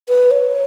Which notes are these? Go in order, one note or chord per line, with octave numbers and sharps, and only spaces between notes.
B4
C#5